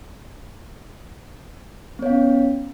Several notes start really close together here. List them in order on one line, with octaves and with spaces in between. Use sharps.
B3 C#5 F5 C#4